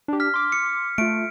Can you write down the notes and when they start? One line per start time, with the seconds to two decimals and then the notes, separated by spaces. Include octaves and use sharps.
0.08 D4 G4
0.20 F6 B6
0.34 C6 D6
0.52 C#7
0.98 A3 F4 D7